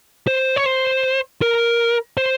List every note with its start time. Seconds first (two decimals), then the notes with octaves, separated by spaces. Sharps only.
0.27 C5
0.56 C#5
0.66 C5
1.42 A#4
2.17 C5